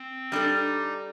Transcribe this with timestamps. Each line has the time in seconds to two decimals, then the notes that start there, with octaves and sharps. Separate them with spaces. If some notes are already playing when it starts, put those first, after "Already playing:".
Already playing: C4
0.31 G3 D4 D#4 A4